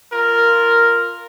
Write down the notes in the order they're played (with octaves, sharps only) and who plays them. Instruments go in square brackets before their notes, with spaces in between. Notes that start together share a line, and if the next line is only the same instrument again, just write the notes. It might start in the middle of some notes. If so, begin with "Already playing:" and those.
[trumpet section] F4 A#4